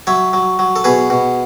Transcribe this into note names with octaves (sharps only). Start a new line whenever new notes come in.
F#3 C#5 E5
F#3
F#3
A4
B2 G#4 B4
B2